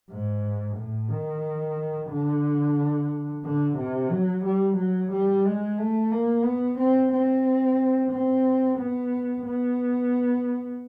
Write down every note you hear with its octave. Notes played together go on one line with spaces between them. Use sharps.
G#2
A2
D#3
D3
D3
C3
F#3
G3
F#3
G3
G#3
A3
A#3
B3
C4
C4
C4
B3
B3